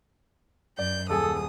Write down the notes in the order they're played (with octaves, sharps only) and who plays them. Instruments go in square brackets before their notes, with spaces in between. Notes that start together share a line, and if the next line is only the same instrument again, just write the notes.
[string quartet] F#2 G6 [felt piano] D5
[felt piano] D#1 G#4 G#5 [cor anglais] A4 [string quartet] D#6